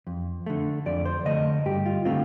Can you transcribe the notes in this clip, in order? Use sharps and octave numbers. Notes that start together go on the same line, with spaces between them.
F2
D3 A3
F2 D5
C5
D3 A3 D#5
G2 G4
F4
D3 A3 C4 F4